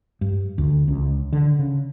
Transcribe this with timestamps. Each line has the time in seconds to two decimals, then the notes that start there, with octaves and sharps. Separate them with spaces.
0.21 G2
0.58 D2
0.88 C#2
1.33 D3
1.59 C#3